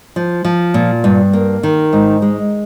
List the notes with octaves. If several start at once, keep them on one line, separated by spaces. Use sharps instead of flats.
F3
F3
A#2
G2
A#3
D#3
G#2
G#3